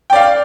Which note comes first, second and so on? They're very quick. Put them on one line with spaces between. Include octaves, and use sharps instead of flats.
G5 D5 F5